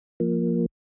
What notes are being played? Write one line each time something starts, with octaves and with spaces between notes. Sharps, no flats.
F3 A#3